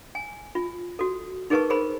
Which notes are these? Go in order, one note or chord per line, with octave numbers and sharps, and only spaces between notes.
G#5
F4
F#4 A4
D#4 G#4 A#4 B4 A5 C#6
G#4 A#4 C5 B5